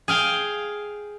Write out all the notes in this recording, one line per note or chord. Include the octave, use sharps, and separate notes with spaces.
G#4 F5 G5